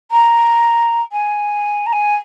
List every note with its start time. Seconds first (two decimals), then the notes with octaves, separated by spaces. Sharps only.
0.11 A#5
1.12 G#5
1.86 A#5
1.92 G#5